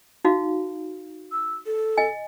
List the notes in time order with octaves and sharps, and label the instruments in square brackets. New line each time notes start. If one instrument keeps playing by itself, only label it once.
[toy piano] D#4 F#4 F5
[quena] E6
A4
[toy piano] D#5 G#5